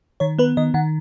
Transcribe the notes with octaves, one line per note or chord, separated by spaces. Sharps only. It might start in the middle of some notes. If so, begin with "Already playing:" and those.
D#3 C#5
B3 B4
D#3 D#5
D#3 F#5